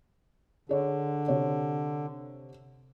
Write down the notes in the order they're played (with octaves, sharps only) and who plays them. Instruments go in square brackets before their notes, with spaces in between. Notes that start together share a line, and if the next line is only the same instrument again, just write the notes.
[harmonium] D3 [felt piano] G#4 C#5
[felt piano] C3 C#5